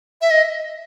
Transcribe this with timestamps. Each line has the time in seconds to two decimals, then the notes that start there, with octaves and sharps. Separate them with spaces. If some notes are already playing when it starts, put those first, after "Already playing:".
0.21 E5
0.31 D#5